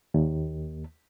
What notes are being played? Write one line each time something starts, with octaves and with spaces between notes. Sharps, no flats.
D#2